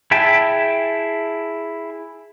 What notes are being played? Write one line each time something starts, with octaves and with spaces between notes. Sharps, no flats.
E4 G#4 E5 G5 A5